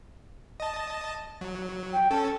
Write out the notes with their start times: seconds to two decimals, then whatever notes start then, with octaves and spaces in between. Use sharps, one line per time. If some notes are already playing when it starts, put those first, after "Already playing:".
0.60 D#5 A5
1.41 F#3
1.93 G5
2.11 C#4 A4 A5